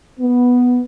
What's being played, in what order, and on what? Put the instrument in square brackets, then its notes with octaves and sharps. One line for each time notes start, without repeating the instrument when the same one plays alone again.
[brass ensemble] B3